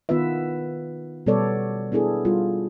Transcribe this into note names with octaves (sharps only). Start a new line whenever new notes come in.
D#3 B3 F4 B4 E5
B2 G3 B3 A4 C#5 D5
B3 D4 E4 G#4 A4
G3 F4